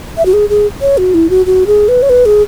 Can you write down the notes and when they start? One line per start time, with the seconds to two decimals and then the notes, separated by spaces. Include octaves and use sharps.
0.17 E5
0.26 F#4
0.33 G#4
0.50 G#4
0.81 C#5
0.98 F#4
1.14 E4
1.30 F#4
1.46 F#4
1.67 G#4
1.88 B4
2.02 C#5
2.10 B4
2.26 G#4